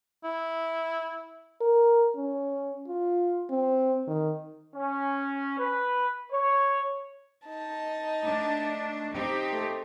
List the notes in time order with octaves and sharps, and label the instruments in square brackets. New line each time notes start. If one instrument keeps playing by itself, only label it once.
[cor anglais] E4
[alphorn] A#4
C#4
F4
C4
D#3
[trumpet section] C#4
B4
C#5
[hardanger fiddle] D#4 A5
[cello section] A3 D4
C4 D#4 G4
[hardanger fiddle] A3